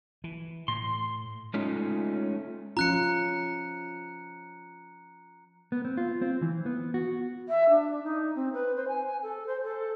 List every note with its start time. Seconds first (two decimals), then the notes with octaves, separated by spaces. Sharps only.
0.24 E3
0.68 A2 C6
1.54 G#3 A3 C#4 D#4 F4
2.77 F3 C#4 F4 A#5 F#6 C#7
5.72 B3
5.85 C4
5.97 F4
6.22 C4
6.42 E3
6.66 B3
6.94 F#4
7.49 E5
7.70 D4
8.04 D#4
8.35 C4
8.53 B4
8.76 C5
8.88 G#5
9.06 G#5
9.23 A4
9.46 C5
9.63 A4